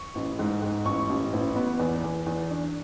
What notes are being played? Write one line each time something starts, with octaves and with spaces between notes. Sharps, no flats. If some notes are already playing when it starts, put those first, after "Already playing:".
Already playing: C#6
A1
G#2
G#2
A1 C#6
A1
A1
B3
E2
E2
E2
D4